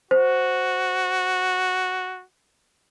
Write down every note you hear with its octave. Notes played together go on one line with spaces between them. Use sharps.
F#4 C5